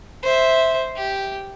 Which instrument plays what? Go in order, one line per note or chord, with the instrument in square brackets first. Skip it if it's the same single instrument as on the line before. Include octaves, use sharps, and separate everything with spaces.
[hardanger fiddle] C5 E5
G4